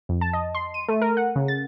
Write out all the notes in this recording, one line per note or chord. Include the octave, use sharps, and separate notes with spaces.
F2
A5
D#5
C6
D#7
A3
A#4
F#5
C#3
A6